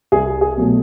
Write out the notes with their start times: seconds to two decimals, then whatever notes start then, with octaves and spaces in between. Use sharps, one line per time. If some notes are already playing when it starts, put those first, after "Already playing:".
0.12 C2 G#4
0.41 G#4
0.57 B2 F#3 A3